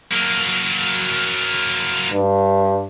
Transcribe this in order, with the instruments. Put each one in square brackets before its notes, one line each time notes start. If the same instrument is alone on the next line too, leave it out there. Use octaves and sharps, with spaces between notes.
[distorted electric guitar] F#3 A#3
[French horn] G2